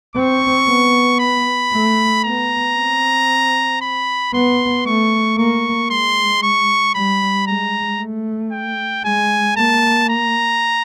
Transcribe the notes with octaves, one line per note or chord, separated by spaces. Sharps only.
C4 C#6
B3
B5
A3
B3 A#5
C4
B5
B3 C6
A3 C#6
A#3 C#6
G#3 C6
C#6
G3 B5
G#3 A#5
A3
G5
G#3 G#5
A#3 A5
A#5